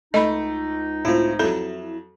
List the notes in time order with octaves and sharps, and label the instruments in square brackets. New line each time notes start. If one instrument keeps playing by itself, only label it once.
[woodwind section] C#2 D#4 [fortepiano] A3 [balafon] D#5 B5
[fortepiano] A2 C4 [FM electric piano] E4 F4
[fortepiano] F2 F#3 [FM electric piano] E4 [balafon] A4